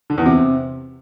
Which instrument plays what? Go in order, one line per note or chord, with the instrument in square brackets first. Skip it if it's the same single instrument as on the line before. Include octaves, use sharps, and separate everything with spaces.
[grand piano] D3
E2
C3